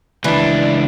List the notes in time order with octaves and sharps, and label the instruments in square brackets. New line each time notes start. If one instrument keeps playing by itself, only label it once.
[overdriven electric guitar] C#2 D4 [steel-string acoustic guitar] E3 [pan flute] D5